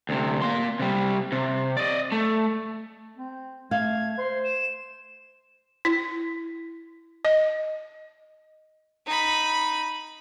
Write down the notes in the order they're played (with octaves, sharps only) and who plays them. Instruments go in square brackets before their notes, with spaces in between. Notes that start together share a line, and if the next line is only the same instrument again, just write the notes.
[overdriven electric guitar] D2 C3
A#3 C6
C3 G3
C3
D5 D#5
A3
[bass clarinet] C4
[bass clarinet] A3 [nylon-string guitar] F5 [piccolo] G#6
[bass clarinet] C5 [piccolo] C6
[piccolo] E7
[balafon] E4
D#5
[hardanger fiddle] D#4 B5